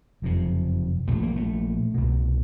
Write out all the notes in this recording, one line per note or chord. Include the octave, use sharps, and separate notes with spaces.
F#1 F2 C3
A#1 A#2 A3
A#3
A3
C2 B2